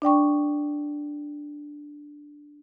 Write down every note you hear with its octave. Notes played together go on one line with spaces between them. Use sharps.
D4 D5 G5 C#6